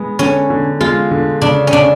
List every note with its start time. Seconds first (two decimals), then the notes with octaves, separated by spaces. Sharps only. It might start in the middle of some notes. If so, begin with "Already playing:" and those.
Already playing: G#3 B3
0.19 D3 C#4
0.50 D3
0.81 G#3 F4
1.11 D3
1.41 C#3 D4
1.67 C#4
1.73 C#3 D4